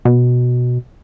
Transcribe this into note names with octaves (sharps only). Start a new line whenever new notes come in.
B2